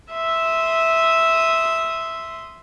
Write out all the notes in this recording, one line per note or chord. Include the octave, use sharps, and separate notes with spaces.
E5 C6 D#6